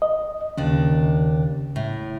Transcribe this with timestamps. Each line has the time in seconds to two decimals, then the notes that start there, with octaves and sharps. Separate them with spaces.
0.02 D#5
0.58 D#2 C#3 D4
1.76 A2